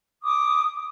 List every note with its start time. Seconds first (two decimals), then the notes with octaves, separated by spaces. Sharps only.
0.23 D6 D#6